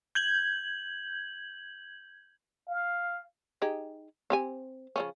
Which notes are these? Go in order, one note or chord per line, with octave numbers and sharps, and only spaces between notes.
G6 G#6 F#7
F5
D#4 G4 G#4
C4 G4 G#5
C#3 F3 C#4